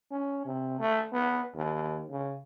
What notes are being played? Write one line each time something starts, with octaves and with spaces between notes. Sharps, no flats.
C#4
C3
A3
B3
D#2
C#3